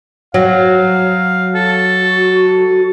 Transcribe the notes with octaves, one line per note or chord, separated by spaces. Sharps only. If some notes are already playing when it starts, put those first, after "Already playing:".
F#3 F5
F#4 A4